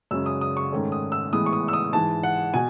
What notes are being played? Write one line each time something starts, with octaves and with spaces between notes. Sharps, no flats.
F#2 C#3 G#3 C#4 E6
D#6
D#6
C#6
G#2 D#3 A3 C#4
D#6
E6
A2 E3 G#3 B3 D#6
C#6
D#6
E6
D#6
G#2 E3 G#3 A5
F#5
B2 G#5